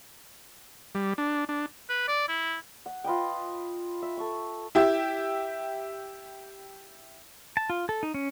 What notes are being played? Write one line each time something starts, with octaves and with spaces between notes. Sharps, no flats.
G3
D4
D4
B4
D5
E4
F#5
F4 B4 D#5 G5
E5
A4 C#6
E4 G4 E5
A5
F4
A4
D#4
C#4